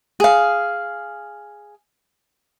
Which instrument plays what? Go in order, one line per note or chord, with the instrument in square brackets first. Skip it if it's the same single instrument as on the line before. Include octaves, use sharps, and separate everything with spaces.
[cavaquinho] G#4 F5